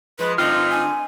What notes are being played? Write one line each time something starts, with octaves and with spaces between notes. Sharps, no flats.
F3 G#3 B4
G2 D3 A3 C4 D#4 F4 D#5 F6
G#5